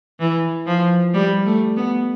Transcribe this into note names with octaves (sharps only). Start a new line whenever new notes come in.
E3
F3
G3
A3
B3